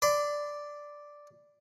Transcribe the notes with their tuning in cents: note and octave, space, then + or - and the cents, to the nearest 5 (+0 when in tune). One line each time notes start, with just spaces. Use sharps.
D5 +0 C6 -45